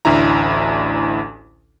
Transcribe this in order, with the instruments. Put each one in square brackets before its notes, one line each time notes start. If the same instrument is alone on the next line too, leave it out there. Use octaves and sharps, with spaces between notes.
[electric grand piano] A1 D2 D4 E4 A#5